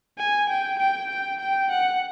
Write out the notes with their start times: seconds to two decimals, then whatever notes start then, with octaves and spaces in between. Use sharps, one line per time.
0.18 G#5
0.49 G5
0.79 G5
1.10 G5
1.41 G5
1.71 F#5